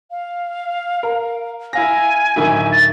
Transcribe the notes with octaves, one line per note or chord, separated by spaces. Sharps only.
F5
A#4
E4 F5 G#5 A#6
D1 D#3 E4
A6